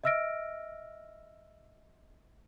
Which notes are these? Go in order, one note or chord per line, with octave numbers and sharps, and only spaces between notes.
D#5 E5 E6 F6 A#6 D7